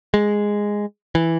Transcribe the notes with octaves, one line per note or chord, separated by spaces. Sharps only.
G#3
E3